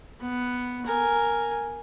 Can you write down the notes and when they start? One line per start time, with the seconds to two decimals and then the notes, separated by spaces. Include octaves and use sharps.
0.21 B3
0.86 A#4 G#5